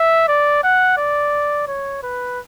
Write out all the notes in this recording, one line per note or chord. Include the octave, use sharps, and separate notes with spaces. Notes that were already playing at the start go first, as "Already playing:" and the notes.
Already playing: E5
D5
F#5
D5
C#5
B4